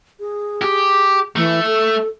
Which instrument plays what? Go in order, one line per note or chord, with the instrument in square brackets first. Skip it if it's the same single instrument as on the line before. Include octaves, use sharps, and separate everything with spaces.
[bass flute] G#4
[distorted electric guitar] G4
[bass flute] E3 [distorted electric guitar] A3
[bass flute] A4